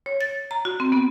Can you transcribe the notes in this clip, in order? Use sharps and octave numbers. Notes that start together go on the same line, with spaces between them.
C#5
A6
A#5
F#4
C4
B3